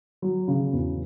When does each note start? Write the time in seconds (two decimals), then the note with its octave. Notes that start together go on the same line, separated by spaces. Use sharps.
0.22 F#3
0.48 C#3
0.73 E2